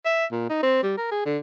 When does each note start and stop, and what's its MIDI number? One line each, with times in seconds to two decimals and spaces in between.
0.05 0.25 76
0.32 0.49 46
0.49 0.58 63
0.63 0.81 60
0.83 0.95 55
0.97 1.07 70
1.11 1.22 68
1.26 1.38 50